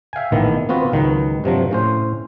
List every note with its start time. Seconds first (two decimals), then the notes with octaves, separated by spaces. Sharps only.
0.13 E5 F5 G5 G#5
0.32 A#1 A2 D#3 E3 B3
0.69 B3 C4 F4 F#4 B4
0.92 C#2 D#3 F#3 D#4 B4
1.44 G2 C3 F3 F#3
1.71 A2 C#4 C5